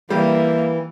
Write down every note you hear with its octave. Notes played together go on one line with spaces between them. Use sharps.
E3 G3 A#3 E5